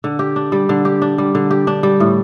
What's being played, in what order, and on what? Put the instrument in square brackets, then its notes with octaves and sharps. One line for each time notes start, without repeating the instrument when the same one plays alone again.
[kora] D3
G4
D4
G3
D3
G4
D4
G3
D3
G4
D4
G3
A2